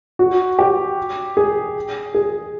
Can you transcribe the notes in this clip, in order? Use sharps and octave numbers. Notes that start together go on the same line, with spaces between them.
F#4
G4
G#4
G#4